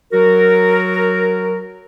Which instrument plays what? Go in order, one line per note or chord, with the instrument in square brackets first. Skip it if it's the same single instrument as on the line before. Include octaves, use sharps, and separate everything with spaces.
[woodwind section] F#3 F#4 A#4